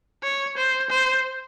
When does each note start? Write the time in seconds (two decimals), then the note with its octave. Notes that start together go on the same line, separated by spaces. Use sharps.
0.23 C#5
0.57 C5
0.90 C5